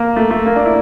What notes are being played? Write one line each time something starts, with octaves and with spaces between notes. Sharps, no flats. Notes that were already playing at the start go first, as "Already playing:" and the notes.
Already playing: A#3
A3
A3
A#3
D4
E4